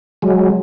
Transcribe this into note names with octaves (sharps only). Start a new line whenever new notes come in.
F#3 G#3